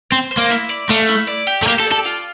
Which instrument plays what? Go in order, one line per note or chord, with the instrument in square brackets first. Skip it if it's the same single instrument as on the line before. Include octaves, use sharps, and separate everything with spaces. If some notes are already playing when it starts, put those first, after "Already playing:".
[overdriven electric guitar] C4 [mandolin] C5
[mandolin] C5
[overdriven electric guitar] A#3
[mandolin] E4
D5
[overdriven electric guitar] A3 [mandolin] F5
[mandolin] E4
D5
G4
[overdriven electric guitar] A3
[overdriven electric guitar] A#3 [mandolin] G4
[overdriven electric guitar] A4
[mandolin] D5
[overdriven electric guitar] A4
[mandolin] F4